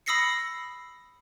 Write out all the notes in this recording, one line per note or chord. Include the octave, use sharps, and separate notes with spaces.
B5 D#6 E6 A#6 C7 C#7